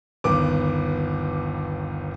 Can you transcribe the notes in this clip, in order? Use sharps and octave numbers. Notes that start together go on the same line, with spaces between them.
G1 D#2 B3 D6